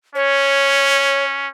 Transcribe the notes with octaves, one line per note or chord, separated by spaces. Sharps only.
C#4 C#5